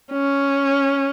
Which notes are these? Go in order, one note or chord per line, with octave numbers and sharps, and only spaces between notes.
C#4